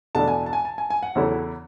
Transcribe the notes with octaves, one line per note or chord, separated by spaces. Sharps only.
E2 B2 A3 D4 A5
G#5
A5
G#5
A5
G#5
G#5
F#5
E2 C#3 F#3 A3 E4